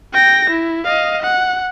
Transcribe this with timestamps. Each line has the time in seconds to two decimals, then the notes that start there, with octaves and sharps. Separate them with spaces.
0.14 G5 A#6
0.50 E4
0.84 D#5 F5
1.23 F#5